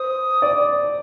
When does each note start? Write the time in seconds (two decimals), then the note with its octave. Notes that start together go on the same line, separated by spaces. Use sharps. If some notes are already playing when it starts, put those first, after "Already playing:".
Already playing: C5 D#6
0.42 D5